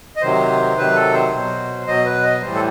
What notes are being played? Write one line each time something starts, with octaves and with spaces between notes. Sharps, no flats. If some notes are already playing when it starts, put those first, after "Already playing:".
D#5
C3 D#3 F#3 C5
C3 D#3 F#3 B4
A4
C5
B2 F#3
B2 F#3 D#5
B4
D#5
A2 E3 G3 C5
A4